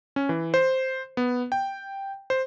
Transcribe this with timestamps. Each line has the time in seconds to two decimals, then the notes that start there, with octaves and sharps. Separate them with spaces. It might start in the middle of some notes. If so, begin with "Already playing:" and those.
0.16 C#4
0.29 E3
0.54 C5
1.17 B3
1.52 G5
2.30 C5